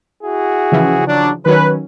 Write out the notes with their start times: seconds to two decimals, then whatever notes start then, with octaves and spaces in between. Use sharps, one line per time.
0.23 E4 F#4 G#4
0.72 C#3 E3 F3
1.07 F#3 D4
1.46 D#3 F#3 C#4 B4